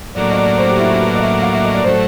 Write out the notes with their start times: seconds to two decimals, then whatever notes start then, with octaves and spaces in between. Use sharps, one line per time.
0.15 A2 F#3 A#3 D4 D5
0.31 D#5
0.37 D5
0.58 C5
0.68 G4
0.79 E4
0.89 F#4
1.00 B4
1.15 D#5
1.21 E5
1.42 F5
1.53 E5
1.64 D#5
1.74 D5
1.84 A2 F#3 A3 C5